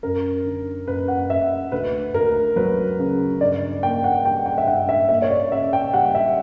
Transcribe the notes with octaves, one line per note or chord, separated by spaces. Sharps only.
F#2 A#4
D3
F#2 B4
F#5
F#2 E5
D2 B4
D2 A#4
F#3 B4
C#3
G2 D5
A#3 G5
F#5
G3 G5
G5
E5
G2 F#5
E5
A#3 E5
C#5
D5
C#3 E5
G5
G3 F#5
E5